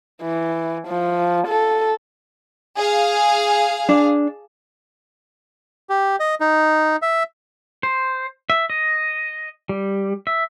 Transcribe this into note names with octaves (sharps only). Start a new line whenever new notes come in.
E3
F3
A4
G#4 F5
D4
G4
D#5
D#4
E5
C5
E5
D#5
G3
E5